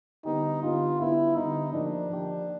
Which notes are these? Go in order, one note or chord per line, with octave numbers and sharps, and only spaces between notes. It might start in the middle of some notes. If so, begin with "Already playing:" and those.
D3 G3 B3 D#4
D3 G3 B3 F4
D3 G3 B3 E4
D3 G3 B3 D#4
F3 A#3 D4 D#4 G4
F3 A#3 D#4 G4